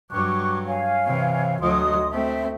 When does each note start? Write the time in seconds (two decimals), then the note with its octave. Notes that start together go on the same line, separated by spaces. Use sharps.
0.11 G2 F#3 C#6 D6 F#6
0.67 C#5 F5 G#5
1.06 C3 E3
1.61 D2 F#3 D#5 C6 D#6
2.12 A3 C4 E5